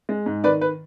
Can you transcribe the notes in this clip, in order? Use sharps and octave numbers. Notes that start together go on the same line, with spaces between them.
G#3
G#2
D#3 B4 D5
B4